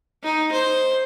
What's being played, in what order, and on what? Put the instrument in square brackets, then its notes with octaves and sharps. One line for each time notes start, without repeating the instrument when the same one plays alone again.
[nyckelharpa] D#4
C5